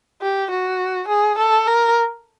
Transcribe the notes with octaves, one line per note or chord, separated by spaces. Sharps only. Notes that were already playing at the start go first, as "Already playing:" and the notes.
G4
F#4
G#4
A4
A#4